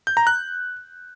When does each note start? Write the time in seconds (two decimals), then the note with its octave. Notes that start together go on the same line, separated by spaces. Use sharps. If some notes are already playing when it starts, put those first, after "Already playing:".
0.07 G6
0.17 A#5
0.27 F#6